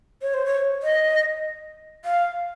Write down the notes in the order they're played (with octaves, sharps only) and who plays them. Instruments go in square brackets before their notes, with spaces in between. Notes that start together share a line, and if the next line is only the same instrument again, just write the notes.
[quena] C#5
C5
C#5
D#5
F5